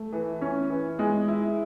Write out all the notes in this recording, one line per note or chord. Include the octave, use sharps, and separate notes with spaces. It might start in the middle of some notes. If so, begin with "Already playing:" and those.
Already playing: A3
E3
C#4
E3
G#3
E4